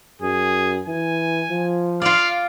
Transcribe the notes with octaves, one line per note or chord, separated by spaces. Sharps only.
F#2 G#4
E3 G#5
F3
F4 D5 F5